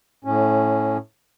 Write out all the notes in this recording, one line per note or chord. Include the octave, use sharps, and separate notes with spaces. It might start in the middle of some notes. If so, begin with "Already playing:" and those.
A2 C#4